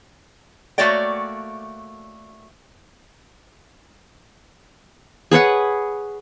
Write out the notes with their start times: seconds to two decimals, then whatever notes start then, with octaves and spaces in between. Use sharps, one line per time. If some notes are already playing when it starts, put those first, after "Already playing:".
0.78 A3 A#3 F#4 C#5 D5 G5
5.31 G#4 B4 C#5 F#5